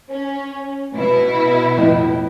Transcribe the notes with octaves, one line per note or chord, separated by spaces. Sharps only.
C#4
B2 E4
F2 A2 D#5